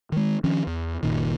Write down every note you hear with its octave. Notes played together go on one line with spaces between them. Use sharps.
D#3 G#3
D#3 F3 C#4
E2
F#1 A#2 D#3